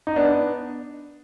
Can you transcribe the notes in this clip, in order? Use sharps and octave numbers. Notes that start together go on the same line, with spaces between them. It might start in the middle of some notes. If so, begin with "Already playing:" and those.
D#4
B3 D4